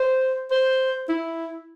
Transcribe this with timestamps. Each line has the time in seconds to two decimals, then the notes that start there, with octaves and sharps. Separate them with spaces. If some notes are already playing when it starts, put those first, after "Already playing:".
Already playing: C5
0.51 C5
1.09 E4